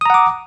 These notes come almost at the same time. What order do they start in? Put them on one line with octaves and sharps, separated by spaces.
D#6 A#5 F#5 D6